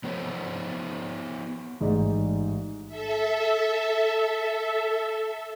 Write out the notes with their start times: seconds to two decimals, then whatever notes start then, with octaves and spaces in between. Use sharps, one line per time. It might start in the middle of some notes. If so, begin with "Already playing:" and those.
0.04 F3 B3 C5 C#5
1.81 A1 G#2 G#3 D5
2.88 A4 E5